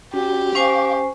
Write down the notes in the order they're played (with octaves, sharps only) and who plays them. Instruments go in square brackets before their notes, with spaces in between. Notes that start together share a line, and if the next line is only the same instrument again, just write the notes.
[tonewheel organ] C#4 F#4 [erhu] G4
[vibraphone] C#4 C5 G#5 [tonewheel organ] F5 C#6 D6